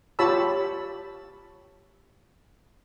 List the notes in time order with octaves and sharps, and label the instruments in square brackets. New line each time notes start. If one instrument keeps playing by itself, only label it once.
[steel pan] F4 G4 C#5 A5 B5 E6